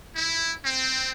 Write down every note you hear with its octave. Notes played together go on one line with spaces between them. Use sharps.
E4
C4